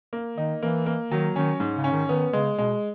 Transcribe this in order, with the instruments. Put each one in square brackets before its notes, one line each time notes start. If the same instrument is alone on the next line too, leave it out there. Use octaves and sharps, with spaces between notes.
[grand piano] A#3
[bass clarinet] D#3 [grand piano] D#4
[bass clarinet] E3 [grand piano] A#3
[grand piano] A#3
[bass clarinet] D#3 [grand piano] F#3
[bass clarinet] D#3 [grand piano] C#4
[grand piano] G#2
[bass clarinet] C#3
[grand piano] C#4
[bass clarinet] D#3
[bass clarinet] D#3 [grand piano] B3
[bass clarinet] C#3 [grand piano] G#3
[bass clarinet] B2 [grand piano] G#3